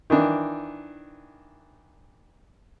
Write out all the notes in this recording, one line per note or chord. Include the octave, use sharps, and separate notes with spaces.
D#3 E3 D4